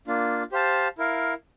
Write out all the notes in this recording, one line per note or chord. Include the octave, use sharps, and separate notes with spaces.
A#3 D4 F4
G4 C5 F5 A5
E4 A#4 F5